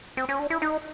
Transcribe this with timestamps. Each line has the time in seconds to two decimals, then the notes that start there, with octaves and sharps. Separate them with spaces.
0.17 C4
0.29 C#4
0.39 D4
0.50 E4
0.62 D#4